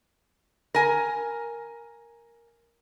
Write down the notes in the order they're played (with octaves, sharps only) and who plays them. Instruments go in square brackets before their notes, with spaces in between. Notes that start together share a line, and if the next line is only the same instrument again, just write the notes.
[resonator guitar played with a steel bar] A#4 G#5